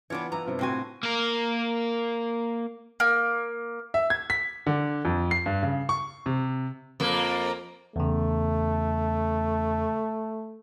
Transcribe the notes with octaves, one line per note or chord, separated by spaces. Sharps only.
E3 B3 D4 F4 G4 C#5
B3 D4 E4 A#5
G2 C3 F4
A2 C4 F#4 C5 G#5
A#3 A#4
A#3
E5
G#6
B6
D3
F2
C7
G2
C#3
C#6
C3
F2 A#3
E2 C#3 A3